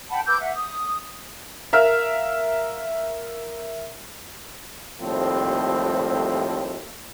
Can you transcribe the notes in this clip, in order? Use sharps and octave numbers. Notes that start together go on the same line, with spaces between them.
F#5 G5 A5 B5
B4 D6 E6 G6
E5 F#5
D#6
A#4 E5 F5 F6
D#2 A2 F3 G3 A3 C4